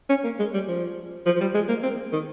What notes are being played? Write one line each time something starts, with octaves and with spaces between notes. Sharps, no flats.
C#4
A#3
G#3
G3
F3
F3
F3
G3
G#3
A#3
C4
D#3